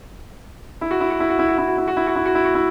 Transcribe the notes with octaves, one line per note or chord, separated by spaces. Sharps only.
E4
F#4
E4
F#4
E4
F#4
E4
F#4
E4
F#4
E4
F#4
E4
F#4
E4
F#4
E4
F#4
E4